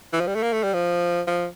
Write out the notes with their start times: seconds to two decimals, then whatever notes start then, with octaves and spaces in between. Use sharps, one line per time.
0.13 E3
0.20 F3
0.27 G3
0.35 A3
0.42 A#3
0.53 A3
0.63 G3
0.74 F3
1.27 F3